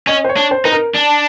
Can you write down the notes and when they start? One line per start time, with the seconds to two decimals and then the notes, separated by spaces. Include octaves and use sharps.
0.07 C#4 D#5
0.24 C5
0.29 C#5
0.37 D4
0.51 C5
0.65 D#4 B4
0.72 A#4
0.94 D4